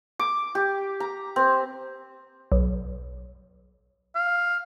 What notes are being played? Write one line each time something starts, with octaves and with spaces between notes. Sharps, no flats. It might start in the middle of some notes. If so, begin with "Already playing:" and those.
D6
G4
A#5
C4
B1
F5